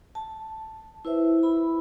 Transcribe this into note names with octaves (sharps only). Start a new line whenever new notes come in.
A5
E4 B4 C5 E5
E4 B5